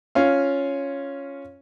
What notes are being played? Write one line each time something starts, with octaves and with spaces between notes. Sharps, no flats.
C#4 F4 F5